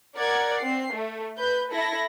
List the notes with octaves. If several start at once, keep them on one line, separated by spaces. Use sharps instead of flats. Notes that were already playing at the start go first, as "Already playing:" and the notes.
A#4 D5 F#5 G#6
C4 C7
A3
B4 G6
E4 A4 A#6